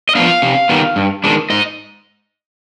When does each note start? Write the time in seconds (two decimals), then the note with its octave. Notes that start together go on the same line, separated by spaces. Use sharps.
0.09 D#5
0.15 F3 B3 D4 F5
0.42 C3
0.69 D#3 G3 B3
0.96 G2
1.24 D#3 G#3 D4
1.50 G#2 D#5